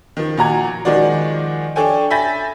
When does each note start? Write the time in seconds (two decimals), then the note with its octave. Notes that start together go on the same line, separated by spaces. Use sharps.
0.17 D#3 F3
0.37 A#2 F#4 A#5 G#6
0.85 D#3 F3 G#3 F#4 D5
1.76 D4 A4 C#5 G5 G#5
2.11 E5 G#5 B5 G6 A6 A#6